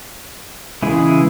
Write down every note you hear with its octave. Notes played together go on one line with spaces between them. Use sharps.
C#3 E3 G#3 E4 G#4